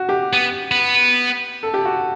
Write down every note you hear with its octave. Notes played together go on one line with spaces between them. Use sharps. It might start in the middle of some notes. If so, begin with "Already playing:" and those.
Already playing: F#4
G4
B3
B3
A4
G4
F#4